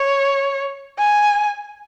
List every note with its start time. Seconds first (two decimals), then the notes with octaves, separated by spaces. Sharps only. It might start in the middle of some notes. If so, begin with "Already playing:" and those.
Already playing: C#5
0.99 G#5